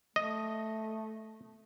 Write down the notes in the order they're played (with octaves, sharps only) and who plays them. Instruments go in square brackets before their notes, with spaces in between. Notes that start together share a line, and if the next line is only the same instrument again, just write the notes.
[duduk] A3 [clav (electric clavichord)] D#5